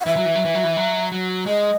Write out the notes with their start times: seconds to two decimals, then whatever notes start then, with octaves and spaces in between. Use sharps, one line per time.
0.01 F#5
0.06 E3 E5
0.16 F#3
0.26 E3
0.35 F#3
0.45 E3
0.55 F#3
0.64 E3
0.77 F#3
1.12 F#3
1.46 G#3 D#5